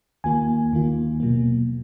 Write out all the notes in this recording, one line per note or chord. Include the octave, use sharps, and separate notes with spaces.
D#2 D#3 A#3 F4 G#5
D#2 D#3 A#3 F4
B2 F#3 A#3